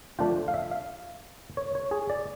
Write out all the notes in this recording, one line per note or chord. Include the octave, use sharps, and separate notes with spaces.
F3 A3 D4 F4 G5
F5
E5
F5
C#5
C#5
G#4
D5